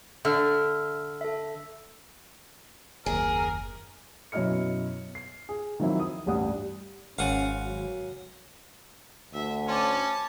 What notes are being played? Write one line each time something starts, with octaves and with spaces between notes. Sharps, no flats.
D3 E5 E6 F6
A4 E5
F#1 D#2 G#4 A#4
F#2 B2 E4 D#5 F6 C#7
C7
G#4
D#3 F3 F#3 C4 E4
D#6
A1 D2 G2 G3 F#5 D#6
G#1 C#4 F5 F#5 G#5
F#3
D2 E5
C#4 A5 C6 D6